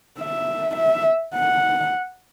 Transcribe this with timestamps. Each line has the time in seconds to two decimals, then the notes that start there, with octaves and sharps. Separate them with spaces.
0.19 E5
0.76 E5
1.35 F#5